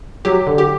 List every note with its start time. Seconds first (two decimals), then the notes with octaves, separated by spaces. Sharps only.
0.25 F#3 G4
0.47 D3
0.58 G4